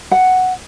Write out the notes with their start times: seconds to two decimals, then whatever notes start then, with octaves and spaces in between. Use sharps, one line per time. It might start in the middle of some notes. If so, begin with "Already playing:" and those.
0.11 F#5